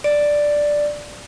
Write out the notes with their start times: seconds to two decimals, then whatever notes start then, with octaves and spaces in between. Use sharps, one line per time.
0.04 D5